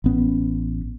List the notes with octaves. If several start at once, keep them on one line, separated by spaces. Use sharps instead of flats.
A1 B3 C#4